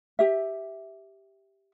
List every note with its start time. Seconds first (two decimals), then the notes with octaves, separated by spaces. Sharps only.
0.19 G4 E5